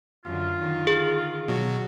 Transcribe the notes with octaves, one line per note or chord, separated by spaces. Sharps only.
F#2 D3 F4
D3 D#3
G#4
B2 F#3 F#4